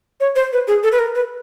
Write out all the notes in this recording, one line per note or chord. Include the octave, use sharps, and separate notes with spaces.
C#5
C5
B4
G#4
A4
B4
A#4
B4